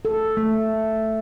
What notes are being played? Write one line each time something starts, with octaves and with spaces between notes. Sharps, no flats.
A4
A3